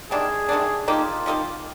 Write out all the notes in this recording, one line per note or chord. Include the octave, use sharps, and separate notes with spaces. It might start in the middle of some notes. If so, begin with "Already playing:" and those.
C3 D#3 G3 D4 G#4
C3 D#3 G3 D4
F3 A#3 D#4 F4 G4
F3 A#3 D#4 G4